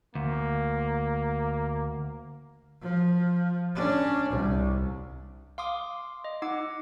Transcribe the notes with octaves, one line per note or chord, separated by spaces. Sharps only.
D2 A#3
F3
C#4 D4
C2
F5 C6 D6 D#6
D#5
D#4 F#5 D6